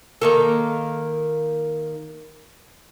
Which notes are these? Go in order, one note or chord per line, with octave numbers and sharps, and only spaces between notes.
D#3 A#3 A4